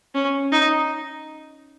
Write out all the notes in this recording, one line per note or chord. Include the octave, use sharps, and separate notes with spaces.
C#4
D#4